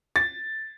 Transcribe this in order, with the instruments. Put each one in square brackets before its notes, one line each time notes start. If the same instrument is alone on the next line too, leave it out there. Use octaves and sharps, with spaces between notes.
[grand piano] A6